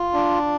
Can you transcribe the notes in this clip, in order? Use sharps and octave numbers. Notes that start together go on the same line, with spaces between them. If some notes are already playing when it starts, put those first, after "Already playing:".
Already playing: F4
D4